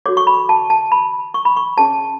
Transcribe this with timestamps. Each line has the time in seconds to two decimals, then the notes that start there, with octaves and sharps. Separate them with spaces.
0.06 F#4 A4 C#5 D6
0.17 C#6
0.27 B5
0.49 A5
0.70 A5
0.92 B5
1.34 C#6
1.45 B5
1.56 C#6
1.77 C#4 G#4 C#5 A5